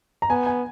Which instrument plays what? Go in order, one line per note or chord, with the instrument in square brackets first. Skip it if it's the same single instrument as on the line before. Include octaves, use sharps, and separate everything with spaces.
[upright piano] A#5
[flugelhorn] B3 [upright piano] G#5
[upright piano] G#5